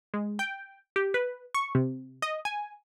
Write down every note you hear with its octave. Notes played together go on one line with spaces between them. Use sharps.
G#3
G5
G4
B4
C#6
C3
D#5
G#5